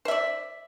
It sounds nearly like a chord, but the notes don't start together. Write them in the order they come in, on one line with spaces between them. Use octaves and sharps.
C5 E5 D5